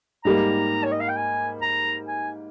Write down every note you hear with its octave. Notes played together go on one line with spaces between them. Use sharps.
G#2 G3 A#3 A#5
C#5
D#5
F5
G5
G#5
A#5
G#5